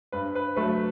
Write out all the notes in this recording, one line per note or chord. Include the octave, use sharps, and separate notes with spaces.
G2 B4
B4
F#3 A3 B4